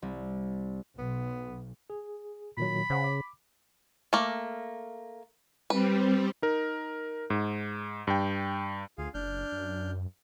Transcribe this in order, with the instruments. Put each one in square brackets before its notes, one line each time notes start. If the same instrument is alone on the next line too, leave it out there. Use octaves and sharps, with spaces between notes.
[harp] C2
[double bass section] B1 [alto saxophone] B3
[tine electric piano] G#4
[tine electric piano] A#2 D#3 F#3 [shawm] B5
[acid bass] C#3 [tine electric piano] C5 F#5
[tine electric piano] D6
[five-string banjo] A3 A#3
[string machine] G3 C4 [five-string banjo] B4
[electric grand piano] D#4 A#4
G#2
G2 G5
[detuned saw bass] D2 [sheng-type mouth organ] F4 G#4 F5
[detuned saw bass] F#1 [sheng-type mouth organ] D4 F6 G6
[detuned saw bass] F#2